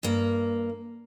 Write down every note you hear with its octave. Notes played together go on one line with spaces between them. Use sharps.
G2 A#3